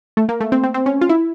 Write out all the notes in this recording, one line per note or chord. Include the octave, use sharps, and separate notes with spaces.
A3
A#3
A3
C4
C4
C4
C#4
F4
E4